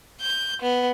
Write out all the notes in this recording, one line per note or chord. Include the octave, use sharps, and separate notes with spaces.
G6
B3